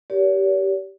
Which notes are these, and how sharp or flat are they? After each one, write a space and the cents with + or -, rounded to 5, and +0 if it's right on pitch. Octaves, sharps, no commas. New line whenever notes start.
G4 -15 A#4 +35 C#5 +45